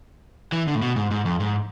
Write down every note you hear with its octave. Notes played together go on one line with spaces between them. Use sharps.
E3
D3
A2
B2
G#2
G#2
F2
G#2